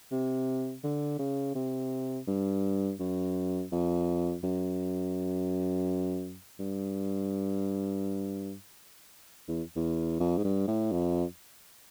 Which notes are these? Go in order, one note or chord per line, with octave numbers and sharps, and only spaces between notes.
C3
D3
C#3
C3
G2
F#2
F2
F#2
G2
E2
E2
F2
G#2
G2
A2
F2